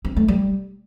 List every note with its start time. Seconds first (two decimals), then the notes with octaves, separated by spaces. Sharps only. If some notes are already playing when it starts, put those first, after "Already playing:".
0.05 C4
0.17 A3
0.28 G3